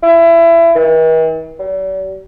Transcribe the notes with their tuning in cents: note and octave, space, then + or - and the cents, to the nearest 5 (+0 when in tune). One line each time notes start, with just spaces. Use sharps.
E4 +25
E3 -45
G3 -45